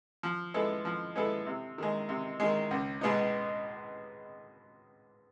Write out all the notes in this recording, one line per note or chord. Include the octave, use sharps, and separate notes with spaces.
F3
G#3 B3 E4 A4
F3
G#3 B3 E4 A4
C3
D#3 G#3
C3
D#3 G#3
C#2
B2 G#3 B3 D#4